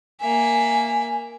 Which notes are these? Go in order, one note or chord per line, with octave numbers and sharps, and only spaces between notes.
A#3 E5 G#5